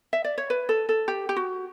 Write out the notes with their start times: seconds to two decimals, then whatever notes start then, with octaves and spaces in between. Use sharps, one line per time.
0.13 E5
0.24 D5
0.38 C#5
0.50 B4
0.69 A4
0.89 A4
1.08 G4
1.29 G4
1.36 F#4